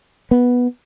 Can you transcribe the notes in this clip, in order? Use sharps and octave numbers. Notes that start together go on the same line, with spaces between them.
B3